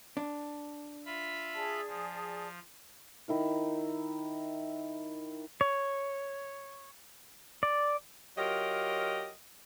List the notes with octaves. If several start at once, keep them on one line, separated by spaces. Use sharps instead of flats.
D4
F4 E5 B5
G#4 D5 A5
F3
D#3 E4 A#4
C#5
D5
F#3 F4 G4 A#4 D#5